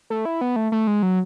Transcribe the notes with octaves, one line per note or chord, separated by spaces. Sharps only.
A3
E4
B3
A3
A3
G#3
F#3